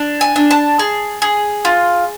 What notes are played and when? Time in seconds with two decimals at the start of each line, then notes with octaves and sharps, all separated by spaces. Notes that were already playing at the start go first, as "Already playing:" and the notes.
Already playing: D4
0.21 G#5
0.36 D4
0.51 A5
0.79 G#4
1.22 G#4
1.65 F4